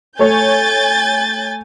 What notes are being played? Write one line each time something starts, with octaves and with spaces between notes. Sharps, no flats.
A3 C#5 G#5 G6 A6